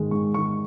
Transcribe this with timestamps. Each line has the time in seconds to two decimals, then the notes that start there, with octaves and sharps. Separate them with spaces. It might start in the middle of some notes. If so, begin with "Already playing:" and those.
Already playing: G#2 D#3 G#3
0.11 G#2 C#6
0.34 D#3 G#3 C#6